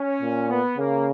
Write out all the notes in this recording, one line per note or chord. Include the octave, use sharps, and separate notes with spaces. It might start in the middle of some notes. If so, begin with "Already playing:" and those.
Already playing: C#4
A#2
B3
C#3 A#3